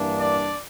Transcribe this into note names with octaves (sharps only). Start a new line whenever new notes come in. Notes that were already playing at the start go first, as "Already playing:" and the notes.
Already playing: G2 E3 A#3 D4
D5